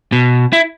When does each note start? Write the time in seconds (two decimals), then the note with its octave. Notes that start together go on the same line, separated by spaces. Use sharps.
0.12 B2
0.53 E4